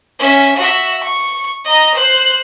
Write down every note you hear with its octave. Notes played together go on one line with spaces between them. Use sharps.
C#4 E5
F#4 E5
C#6
D#5 A#5
C5 F#6